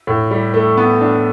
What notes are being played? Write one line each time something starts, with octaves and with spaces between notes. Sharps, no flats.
A2
G3
A3
B3
D4